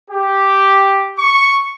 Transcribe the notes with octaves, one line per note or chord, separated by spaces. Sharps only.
G4
C#6